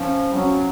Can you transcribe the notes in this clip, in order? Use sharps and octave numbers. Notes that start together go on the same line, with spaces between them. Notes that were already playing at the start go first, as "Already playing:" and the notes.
Already playing: F3 C#4
G3
F#3 C#4